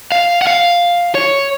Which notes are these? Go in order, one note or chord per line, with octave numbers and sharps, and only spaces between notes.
F5
F#5
F5
C#5